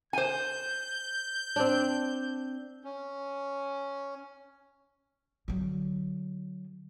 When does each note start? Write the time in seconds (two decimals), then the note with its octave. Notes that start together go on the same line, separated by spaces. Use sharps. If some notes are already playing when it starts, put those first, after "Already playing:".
0.13 C5 G#5 G6
1.56 C4 D4
2.84 C#4
5.48 D3 F#3